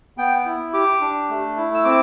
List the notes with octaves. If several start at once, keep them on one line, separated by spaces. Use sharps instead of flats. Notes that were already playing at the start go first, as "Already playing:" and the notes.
B3 G5
E4
G4 D6
D4
A3
E4
E6
C4 D6